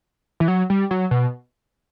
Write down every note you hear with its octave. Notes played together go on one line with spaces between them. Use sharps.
E3
F#3
G3
F#3
B2